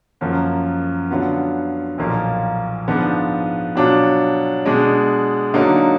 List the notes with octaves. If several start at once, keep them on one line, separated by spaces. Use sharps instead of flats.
F#2 F3 A#3
D3 F#3 B3 F4
B1 A#2 F3 A#3
G#2 F3 B3 D4 F4
B2 F#3 D4 F4
B2 G#3 D4
D3 F#3 A#3 D#4